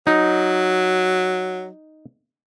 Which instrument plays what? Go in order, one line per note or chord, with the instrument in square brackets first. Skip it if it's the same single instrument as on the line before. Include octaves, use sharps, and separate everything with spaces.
[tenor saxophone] F#3 [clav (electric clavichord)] D#4